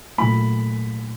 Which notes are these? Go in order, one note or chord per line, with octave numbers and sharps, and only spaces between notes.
A#2 F#3 A3 B5